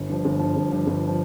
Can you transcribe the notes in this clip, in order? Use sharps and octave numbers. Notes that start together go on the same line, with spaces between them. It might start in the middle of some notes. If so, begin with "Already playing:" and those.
Already playing: G1
G2 F3
G1
G2 F3
G1
G2 F3
G1
F3